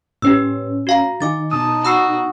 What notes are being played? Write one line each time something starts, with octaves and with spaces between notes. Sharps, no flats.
A2 C#4 G4 B4 E6
F#4 F5 A#5
D#3 D#4 G#5 D6 A6
B2 D#4 A5 D#6
F#4 B5 E6 C7